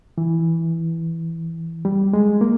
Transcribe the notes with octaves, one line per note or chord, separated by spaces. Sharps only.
E3
G3
G#3
A#3